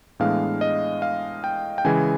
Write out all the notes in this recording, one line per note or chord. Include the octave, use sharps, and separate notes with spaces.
A2 E3 G#3 B3 D4 F5
D#5
F5
G5
G5
C#3 E3 G#3 G#5